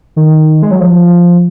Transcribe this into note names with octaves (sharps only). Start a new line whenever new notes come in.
D#3
G#3
F#3
F3